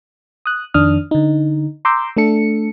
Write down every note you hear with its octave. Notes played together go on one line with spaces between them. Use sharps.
D#6 F#6
F2 D#3 D4 D#6 F6
D3 D#4
A#5 C6 D6 E6 G6
A3 D4 A4 C#7